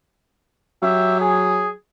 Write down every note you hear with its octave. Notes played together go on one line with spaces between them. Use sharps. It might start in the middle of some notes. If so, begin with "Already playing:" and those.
F#3 G4 E5
G#4